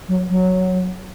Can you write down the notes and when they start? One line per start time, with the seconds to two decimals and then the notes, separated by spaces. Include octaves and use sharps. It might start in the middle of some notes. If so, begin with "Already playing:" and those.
0.08 F#3
0.29 F#3